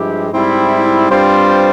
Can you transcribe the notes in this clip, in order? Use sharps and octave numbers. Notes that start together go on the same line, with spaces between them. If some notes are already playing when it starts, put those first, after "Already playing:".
Already playing: G2 F3 G#3 E4 G4
G#2 G3 C4 E4
G2 G3 C4 F4 C5